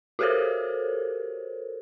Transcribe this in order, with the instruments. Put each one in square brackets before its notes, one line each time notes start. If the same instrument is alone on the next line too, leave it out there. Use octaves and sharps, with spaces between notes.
[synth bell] F#4 G4 A4 A#4 C5 C#5